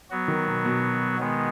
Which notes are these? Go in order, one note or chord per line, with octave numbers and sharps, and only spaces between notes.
F#3 B3 F#4
D#3
B2
B2
D#3 G#3 B3